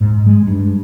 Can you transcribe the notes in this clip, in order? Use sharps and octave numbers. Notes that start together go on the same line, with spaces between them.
G#2
G#3
G2